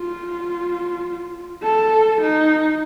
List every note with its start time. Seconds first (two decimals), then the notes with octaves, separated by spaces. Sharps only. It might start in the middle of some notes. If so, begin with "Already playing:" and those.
Already playing: F4
1.63 A4
2.21 D#4